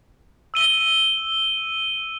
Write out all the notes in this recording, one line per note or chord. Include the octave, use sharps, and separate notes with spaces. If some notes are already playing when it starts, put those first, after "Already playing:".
E6 D#7 G7